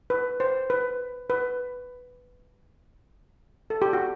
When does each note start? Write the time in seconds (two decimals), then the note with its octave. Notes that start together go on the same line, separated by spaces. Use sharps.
0.10 B4
0.40 C5
0.70 B4
1.30 B4
3.70 A4
3.82 G4
3.93 F#4